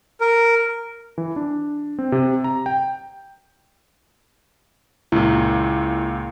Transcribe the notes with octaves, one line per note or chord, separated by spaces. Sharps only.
A#4
E3
D4
C4
C3
A#5
G5
C#2 A#2 E4